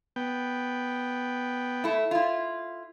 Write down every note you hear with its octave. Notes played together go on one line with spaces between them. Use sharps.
B3 G5
A3 E4
E4 F4